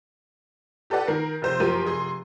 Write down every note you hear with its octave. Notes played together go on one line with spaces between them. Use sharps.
G4 A4 B4 D5 F#5
D#3 A#4 C7
F1 C5
F#2 F3 G4 A#4 C6 D#7
F1 G#4 C6